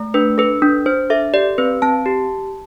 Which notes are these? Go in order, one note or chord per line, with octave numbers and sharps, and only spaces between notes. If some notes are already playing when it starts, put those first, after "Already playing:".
Already playing: A3
D4 B4
A4 B4
D4
D4 C5
A4 E5
G4 D5
C4 B4
C4 A5
G4